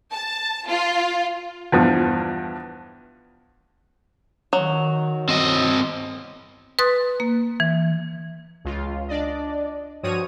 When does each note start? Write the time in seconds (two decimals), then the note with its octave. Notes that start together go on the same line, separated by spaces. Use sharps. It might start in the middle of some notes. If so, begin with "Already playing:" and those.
0.12 A5
0.67 F4
1.72 E2 G2 F3
4.53 D#3 F#3
5.29 C4 D#5
6.79 B4 C6 D#6 F#6 A6
7.20 A#3
7.60 E3
8.65 C#2 F4
9.08 D4 D5 D#5
10.03 G2 F3 F#4 C#5 D#6 D#7